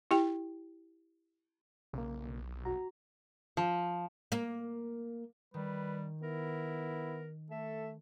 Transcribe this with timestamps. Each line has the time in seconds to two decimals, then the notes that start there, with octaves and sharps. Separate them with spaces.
0.11 E4 G4 G5
1.93 B1 C#3 A#3
2.65 F#4 A#5
3.57 F3
4.32 A#3
5.54 D#3 G3 B4
6.23 B3 E4 A#4
7.51 A3 A4 E5